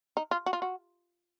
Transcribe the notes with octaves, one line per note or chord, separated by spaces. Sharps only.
D#4
F4
F#4
F4
F#4